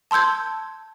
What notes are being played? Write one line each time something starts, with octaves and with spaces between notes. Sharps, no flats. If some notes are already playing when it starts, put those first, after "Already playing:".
A5 C6 E6 G6 G#6